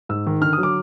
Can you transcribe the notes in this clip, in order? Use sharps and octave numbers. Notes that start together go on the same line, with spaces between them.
G#2 E6
D#3
D3 F6
D#6
F#3
D6